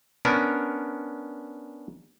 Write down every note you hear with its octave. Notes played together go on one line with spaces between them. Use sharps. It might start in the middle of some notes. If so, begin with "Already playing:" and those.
B3 C#4 D4 A#4